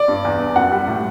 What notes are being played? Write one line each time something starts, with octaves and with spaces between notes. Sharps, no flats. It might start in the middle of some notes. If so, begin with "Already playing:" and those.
Already playing: D5
G2
E2
E2
F#2 F#5
G3
A2